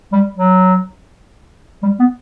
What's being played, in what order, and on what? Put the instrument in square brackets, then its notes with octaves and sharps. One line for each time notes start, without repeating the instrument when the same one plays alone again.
[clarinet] G3
F#3
G3
B3